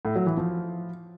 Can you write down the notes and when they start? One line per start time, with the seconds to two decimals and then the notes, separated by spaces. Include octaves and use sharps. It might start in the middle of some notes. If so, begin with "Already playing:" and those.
0.05 A2
0.16 F#3
0.26 E3
0.37 F3